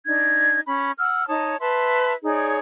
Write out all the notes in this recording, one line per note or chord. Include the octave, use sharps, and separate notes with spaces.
D4 D#4 G#6
C#4 B5
F#5 E6 F6
D#4 C#5 A5 D#6
B4 E5 A5 C6
D#4 G#4 C#5 D5